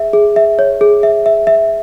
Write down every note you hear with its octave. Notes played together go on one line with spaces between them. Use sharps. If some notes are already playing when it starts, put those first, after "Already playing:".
Already playing: G#4 E5
G#4
E5
C#5
G#4
E5
E5
E5